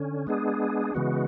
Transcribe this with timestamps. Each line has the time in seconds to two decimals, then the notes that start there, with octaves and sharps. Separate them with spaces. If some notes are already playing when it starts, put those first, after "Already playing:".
Already playing: D3 C#4
0.27 G#3 B3 D4 G#4
0.94 C#3 E3 G#3 B3 F#4